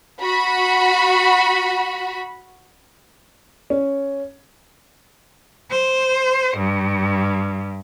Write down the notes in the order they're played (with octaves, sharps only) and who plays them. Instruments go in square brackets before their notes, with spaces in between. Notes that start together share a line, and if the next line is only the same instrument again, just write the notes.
[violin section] F#4 B5
[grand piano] C#4
[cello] C5
G2